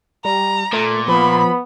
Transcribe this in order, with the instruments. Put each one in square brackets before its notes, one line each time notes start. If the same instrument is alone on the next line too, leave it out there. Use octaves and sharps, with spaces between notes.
[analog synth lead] G3 [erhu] A#5
[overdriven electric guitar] A#2 [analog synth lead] A3
[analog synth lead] F3 [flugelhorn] B3 [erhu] B5